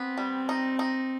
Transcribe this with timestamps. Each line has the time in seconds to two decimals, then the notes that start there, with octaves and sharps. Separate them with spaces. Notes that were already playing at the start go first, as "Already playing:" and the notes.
Already playing: B3 C4
0.18 G3
0.49 D#4
0.79 D#4